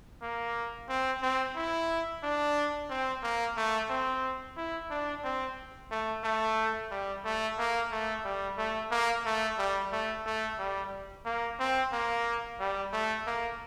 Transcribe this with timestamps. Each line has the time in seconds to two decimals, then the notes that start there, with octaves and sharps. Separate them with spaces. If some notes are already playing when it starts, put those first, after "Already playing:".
0.22 A#3
0.89 C4
1.22 C4
1.56 E4
2.23 D4
2.89 C4
3.23 A#3
3.56 A3
3.90 C4
4.57 E4
4.90 D4
5.24 C4
5.91 A3
6.23 A3
6.91 G3
7.24 A3
7.58 A#3
7.91 A3
8.24 G3
8.58 A3
8.91 A#3
9.25 A3
9.58 G3
9.92 A3
10.26 A3
10.58 G3
11.26 A#3
11.59 C4
11.92 A#3
12.59 G3
12.93 A3
13.26 A#3